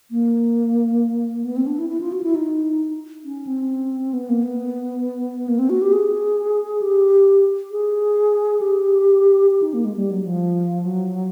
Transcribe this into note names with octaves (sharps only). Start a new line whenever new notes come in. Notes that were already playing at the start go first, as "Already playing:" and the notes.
A#3
B3
C4
D4
E4
E4
F4
F#4
E4
D#4
C#4
C4
B3
A#3
B3
A#3
C4
F#4
G4
G#4
G4
G#4
G4
G4
D#4
A#3
G#3
G3
F#3
F3
F#3